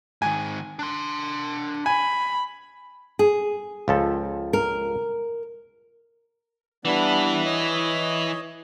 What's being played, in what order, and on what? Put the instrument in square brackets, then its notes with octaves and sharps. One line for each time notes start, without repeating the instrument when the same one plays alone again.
[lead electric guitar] G#2 D#3 [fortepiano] G#5
[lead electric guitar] D4 C6
[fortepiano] G#5 [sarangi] B5
[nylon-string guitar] G#4
[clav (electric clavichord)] C#2 F3 A4
[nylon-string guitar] A#4
[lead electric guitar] E3 E4 [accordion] G3 B3 D4
[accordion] C#5 D#5